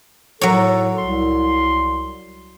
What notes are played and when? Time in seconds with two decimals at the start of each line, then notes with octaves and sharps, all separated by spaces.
0.41 A2 F#3 A4 C#5
0.98 C2 C6